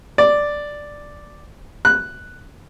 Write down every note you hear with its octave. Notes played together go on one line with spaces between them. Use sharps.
D5
F#6